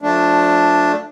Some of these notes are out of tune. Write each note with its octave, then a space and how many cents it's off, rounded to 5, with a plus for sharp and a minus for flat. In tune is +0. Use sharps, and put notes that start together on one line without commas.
F3 +30 A3 -5 D4 +0